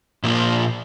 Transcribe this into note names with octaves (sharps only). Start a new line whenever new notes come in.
A#2 F3 A#3 F4